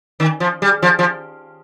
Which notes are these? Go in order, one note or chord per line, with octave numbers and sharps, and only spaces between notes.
D#3
F3
G3
F3
F3